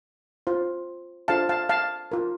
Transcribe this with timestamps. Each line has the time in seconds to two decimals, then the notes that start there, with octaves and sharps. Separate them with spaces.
0.47 F4 C5
1.28 D4 F4 A4 C5 F5 A5
1.49 F5 A5
1.69 F5 A5
2.12 F4 A#4